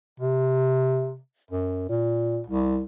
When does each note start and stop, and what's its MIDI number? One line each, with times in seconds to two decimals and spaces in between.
0.20 1.18 48
1.51 1.86 42
1.89 2.41 46
2.47 2.84 36